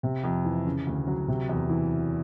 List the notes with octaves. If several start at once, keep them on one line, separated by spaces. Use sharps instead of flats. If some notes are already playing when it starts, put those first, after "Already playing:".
C3
F2
E3
C#3
D2
F#3
C3
E2
E3